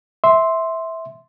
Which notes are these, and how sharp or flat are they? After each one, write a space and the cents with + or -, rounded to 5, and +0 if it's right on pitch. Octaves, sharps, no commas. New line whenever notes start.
E5 -15 C6 +0